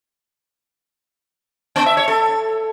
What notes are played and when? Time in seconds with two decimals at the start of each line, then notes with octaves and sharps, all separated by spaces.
1.76 B3
1.86 E5
1.97 C#5
2.08 A4